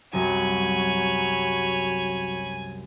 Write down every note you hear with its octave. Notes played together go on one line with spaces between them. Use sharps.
C2 F#2 F#3 C#5 G#5 B5